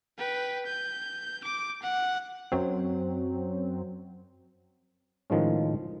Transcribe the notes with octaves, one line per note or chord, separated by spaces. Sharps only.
B4 G5
G6
D6
F#5
F#2 F#3 C4
A2 D#3 F3 G#3 C#4